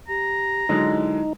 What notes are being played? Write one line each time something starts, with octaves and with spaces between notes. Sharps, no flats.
G4 A#5
D3 F#3 G#3 D#4 E4